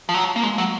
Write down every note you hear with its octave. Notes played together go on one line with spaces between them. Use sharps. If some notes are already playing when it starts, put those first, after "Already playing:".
F3
F#3
A#3
G#3
F#3